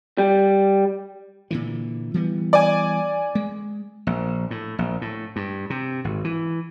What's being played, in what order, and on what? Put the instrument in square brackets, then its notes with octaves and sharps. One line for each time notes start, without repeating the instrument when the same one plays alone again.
[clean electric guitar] G3
[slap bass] A#2 D3 E3
E3 G3 B3
[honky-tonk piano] D5 G#5
[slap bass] G#3
A#1
A2
A#1
A2
G2
C3
G#1
E3